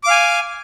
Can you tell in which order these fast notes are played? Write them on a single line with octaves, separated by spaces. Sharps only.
D6 F5 G#5